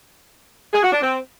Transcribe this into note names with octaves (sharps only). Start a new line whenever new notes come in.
G#4
F#4
D4
C4